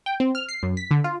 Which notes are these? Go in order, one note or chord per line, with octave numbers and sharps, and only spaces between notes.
G5
C4
F6
C7
F#2
B6
D3
F4